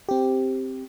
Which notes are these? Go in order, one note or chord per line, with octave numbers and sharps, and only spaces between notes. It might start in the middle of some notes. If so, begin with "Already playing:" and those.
C4 G4